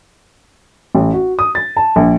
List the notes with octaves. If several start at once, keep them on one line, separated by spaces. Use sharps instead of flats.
A1
F#4
D#6
A6
A5
A#1